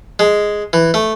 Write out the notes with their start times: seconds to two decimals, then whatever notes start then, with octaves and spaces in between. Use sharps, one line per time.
0.19 G#3
0.73 E3
0.94 A3